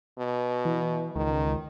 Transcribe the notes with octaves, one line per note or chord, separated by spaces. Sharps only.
B2
E3
C#2 D#3